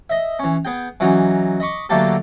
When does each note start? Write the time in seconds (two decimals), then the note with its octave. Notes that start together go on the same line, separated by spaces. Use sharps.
0.10 D#5 E5
0.39 E3 C#4
0.65 B3 G#4 G5
1.00 E3 F#3 C#4 D#4 F#4
1.60 D#5 B5 C#6 D6
1.89 D3 F#3 A3 A#3 G4 A4